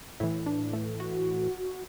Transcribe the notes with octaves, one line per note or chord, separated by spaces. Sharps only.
A2 E3 E4
D4
A3
F#4